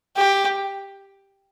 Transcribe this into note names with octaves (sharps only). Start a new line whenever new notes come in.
G4